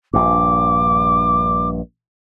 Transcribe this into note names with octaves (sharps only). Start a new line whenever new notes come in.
A#1 G2 D6